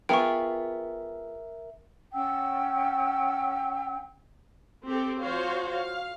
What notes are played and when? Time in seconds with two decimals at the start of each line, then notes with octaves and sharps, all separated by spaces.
0.09 B3 F4 G#4 A#4 E5 G5 C#6
2.14 C#4 F#5 G5 E6
4.85 C4 G4 A4
5.19 F3 F#4 C5 C#5 F5
5.72 F5